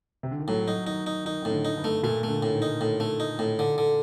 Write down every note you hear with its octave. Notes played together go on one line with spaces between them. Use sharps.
C3
D3
D#3
A2 F#3
F#3 D#4
D#3 D#4
D#4
D#3 D#4
A2 D#3
D3
D#4
G2
A3
A#2 A3
A3
D3
A2
D#3
D#4
A2
A3
D#4
A2
D3
D3